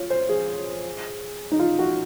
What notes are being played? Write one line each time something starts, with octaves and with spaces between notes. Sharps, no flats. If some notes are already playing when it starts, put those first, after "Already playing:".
Already playing: F4 C#5
C5
G#4
D#4
F4
F#4